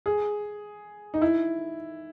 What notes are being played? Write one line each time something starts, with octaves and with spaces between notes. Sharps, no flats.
G#4
D#4
E4